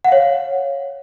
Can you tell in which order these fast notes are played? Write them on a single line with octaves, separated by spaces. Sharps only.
F#5 F5 C#5